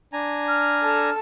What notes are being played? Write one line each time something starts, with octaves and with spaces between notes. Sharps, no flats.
D4 G#5 A#5
F6
A4